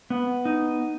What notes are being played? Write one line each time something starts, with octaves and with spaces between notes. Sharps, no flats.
B3
D#4